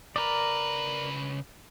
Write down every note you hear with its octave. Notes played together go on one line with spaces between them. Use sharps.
C#3 A#4 B4 D5